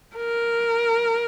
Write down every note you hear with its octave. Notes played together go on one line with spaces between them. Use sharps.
A#4